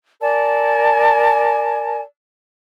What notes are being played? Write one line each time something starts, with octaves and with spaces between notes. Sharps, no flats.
A#4 D5 G#5 A5